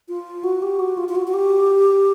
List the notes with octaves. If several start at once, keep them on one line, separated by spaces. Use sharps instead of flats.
F4
F#4
G4
F#4
F4
F4
F#4
F#4
G4